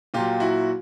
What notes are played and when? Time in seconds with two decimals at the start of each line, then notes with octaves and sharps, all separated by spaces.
0.14 A#2 F#3 F4 G4
0.40 E4 F#4